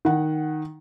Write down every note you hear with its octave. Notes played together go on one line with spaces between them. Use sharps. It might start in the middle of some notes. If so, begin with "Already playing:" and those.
D#3 F#5